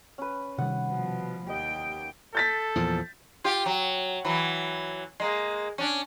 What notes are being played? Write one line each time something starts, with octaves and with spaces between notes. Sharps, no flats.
C#4 B4
C3 D#3 G3 F#5
B2 F3
D#2 G4 D#5 G5
A4 G6 A6 B6
E2 A#2 F3
F4 G4
F#3
E3 F#3
G#3 A#3
C#4 D4